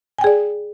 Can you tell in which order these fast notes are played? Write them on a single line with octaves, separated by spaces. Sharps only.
G#5 G5 G#4 D5